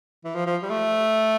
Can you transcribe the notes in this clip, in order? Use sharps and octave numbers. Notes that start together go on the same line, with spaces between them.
E3
F3
F3
G3
A3